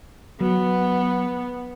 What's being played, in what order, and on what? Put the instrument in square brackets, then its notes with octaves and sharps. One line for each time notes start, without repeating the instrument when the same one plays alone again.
[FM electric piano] F#3 [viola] B3